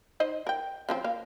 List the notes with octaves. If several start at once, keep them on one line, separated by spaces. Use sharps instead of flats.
D#4 C5 D#5
A#4 G5
C#3 F3 C4
A#3 F5